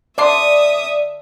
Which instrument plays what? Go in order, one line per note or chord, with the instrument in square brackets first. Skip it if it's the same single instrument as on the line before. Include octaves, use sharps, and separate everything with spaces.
[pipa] D3 D4 C6 [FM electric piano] D5 [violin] E5 D#6